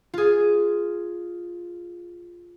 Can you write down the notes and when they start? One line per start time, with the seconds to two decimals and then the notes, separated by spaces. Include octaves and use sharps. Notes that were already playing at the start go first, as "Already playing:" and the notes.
0.14 F4 G#4